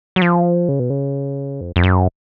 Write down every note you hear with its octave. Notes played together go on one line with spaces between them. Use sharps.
F#3
F3
C#3
B2
C#3
F2
F2
F#2